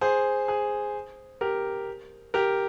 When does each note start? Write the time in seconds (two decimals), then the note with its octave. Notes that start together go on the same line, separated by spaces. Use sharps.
0.01 G#4 C5
0.48 G#4
1.41 G4 A#4
2.34 G4 A#4